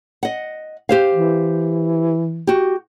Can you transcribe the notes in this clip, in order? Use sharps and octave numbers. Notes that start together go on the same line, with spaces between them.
D#5 F#5
G4 C5 F5
E3
F#4 G4